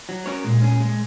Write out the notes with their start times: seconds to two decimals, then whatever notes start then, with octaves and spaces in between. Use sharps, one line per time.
0.09 F#3
0.26 C#4 F#4 A#4 C#5
0.44 A#2 G#3
0.62 C#4 G#4
0.80 G#3